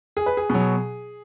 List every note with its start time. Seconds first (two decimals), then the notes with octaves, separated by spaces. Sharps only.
0.17 G#4
0.26 B4
0.37 G#4
0.50 B2 F#3